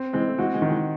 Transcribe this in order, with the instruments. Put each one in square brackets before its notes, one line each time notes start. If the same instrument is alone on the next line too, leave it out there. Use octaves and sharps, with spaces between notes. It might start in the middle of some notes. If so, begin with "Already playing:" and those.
Already playing: [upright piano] C4
[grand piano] E3 G#3 [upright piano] C4
[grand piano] A3
[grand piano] E3 G#3 [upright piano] F#4
[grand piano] E3 G#3
[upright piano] D#3
[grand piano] E3 G#3